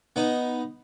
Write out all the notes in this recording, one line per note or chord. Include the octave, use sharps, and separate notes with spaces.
B3 D#4